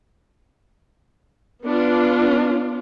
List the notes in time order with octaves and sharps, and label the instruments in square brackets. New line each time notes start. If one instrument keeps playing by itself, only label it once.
[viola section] B3 D4 F4